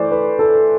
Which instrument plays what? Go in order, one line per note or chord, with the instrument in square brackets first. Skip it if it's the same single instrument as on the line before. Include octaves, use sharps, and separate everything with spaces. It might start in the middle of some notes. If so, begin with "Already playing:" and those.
Already playing: [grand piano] E3 A3 C5 D5
B4
A4